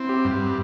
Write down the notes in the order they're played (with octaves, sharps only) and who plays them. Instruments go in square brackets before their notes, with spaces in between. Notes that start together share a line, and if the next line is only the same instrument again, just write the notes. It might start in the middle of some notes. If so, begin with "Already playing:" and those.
Already playing: [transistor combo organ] C4 [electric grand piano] E4
[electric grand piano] G4
[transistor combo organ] G2